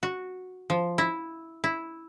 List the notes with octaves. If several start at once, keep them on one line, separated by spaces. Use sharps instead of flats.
F#4
F3
E4
E4